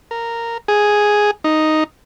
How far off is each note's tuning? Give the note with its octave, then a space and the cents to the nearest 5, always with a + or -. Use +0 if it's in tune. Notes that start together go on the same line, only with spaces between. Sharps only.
A#4 -10
G#4 +0
D#4 +0